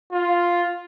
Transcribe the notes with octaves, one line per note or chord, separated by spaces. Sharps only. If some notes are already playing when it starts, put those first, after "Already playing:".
F4